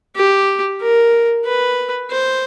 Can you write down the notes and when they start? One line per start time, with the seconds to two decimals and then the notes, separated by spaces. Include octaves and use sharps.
0.16 G4
0.81 A#4
1.46 B4
2.11 C5